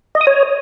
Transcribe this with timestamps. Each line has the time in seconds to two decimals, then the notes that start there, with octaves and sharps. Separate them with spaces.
0.15 D#5
0.21 D#6
0.27 C#5